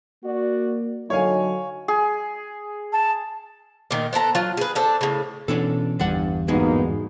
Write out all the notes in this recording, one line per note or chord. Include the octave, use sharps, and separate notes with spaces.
A#3 F#4 D5
D3 F#3 D#4 A4 C#5 F5 G#5
G#4
A5
A#2 D#3
B3 C4 A4 A#5
F#3 F4
G#4 B4
C4 D4 A4
A2 C#3
B2 E3 C#4 D4 A4
G1 E2 G2 D4 F#5
G#2 B2 G#3 A#3 B3 D#4